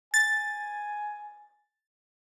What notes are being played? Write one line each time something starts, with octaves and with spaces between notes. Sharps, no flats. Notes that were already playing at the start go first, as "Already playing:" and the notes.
G#5 A6